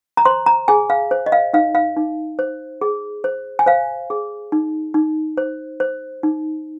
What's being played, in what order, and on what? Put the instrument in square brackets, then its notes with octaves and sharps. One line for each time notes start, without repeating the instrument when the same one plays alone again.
[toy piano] A#5
C5 C6
A#5
G#4 G#5
F5
C5
D#5
F5
D#4 F5
F5
D#4
C5
G#4
C5
G#5
C5 F5
G#4
D#4
D#4
C5
C5
D#4